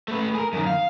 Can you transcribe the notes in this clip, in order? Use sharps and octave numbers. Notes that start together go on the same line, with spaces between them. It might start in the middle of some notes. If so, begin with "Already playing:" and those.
A3 B4
G#4 A#4
F#2 D#3
F5